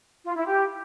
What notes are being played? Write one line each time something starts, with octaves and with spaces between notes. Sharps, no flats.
F4
E4
G4